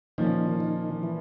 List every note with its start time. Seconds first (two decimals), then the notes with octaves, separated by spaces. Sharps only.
0.18 A#2 D#3 F3 A#3 C#4
0.60 D#3
1.03 E3